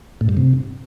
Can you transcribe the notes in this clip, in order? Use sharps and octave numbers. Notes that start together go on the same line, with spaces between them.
A2
G2
C3